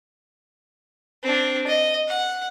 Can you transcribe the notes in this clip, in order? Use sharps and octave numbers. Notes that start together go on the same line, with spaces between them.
C4 D4
D#5
F#5